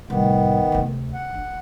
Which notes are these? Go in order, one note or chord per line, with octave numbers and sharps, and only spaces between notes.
C2 A2 D#3 B3
D2 C3
F#5
D4